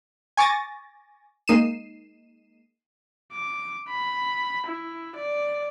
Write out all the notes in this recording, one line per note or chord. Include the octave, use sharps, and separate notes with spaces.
G#5 C#6 D6 A6 A#6
G#3 A#3 D#4 C7 D#7 E7
D6
B5
E4
D5